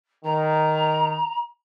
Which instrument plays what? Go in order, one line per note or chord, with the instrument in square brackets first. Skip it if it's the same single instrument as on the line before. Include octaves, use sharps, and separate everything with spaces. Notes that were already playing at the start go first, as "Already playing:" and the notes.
[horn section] D#3 [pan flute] A#5